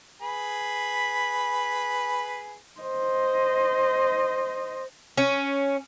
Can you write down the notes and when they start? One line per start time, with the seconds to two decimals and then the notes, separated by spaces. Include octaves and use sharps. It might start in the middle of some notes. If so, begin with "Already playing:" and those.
0.22 G#4 B4 B5
2.81 C5 D#5
5.17 C#4